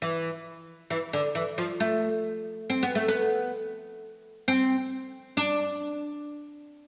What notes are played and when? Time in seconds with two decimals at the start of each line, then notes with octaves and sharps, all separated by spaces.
0.02 E3
0.90 E3
1.13 D3
1.35 E3
1.58 F3
1.80 A3
2.70 C4
2.83 B3
2.95 A3
3.08 B3
4.48 C4
5.37 D4